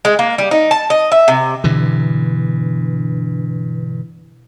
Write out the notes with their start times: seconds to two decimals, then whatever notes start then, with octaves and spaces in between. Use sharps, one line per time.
0.05 G#3
0.19 A#3
0.38 G3
0.51 D#4
0.71 A5
0.90 D#5
1.12 E5
1.28 C3
1.64 G2 B2 D3 E3